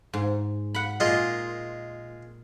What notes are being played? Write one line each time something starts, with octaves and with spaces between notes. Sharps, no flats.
G#2
F#5 B5
A#2 G#3 F4 D#5